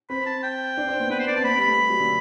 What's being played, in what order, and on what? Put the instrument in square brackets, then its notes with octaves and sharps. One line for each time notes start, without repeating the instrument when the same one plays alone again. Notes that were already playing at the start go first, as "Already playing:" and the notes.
[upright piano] C4 [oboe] B5
[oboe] A5
G5
[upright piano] D4
C4
B3
[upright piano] B3 [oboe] B4
[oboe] C5
D5
[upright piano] C4 [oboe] A5
[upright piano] B3 [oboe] B5
[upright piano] G3
[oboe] B5
[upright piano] A3
G3
F#3
D3